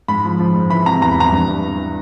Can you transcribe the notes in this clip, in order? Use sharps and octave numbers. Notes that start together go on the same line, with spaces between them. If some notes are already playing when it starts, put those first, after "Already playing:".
G#2 B5
F3
F3
G#2
E3 B5
C3 A#5
E2 A#5
B5
E2 A#5
G2
E3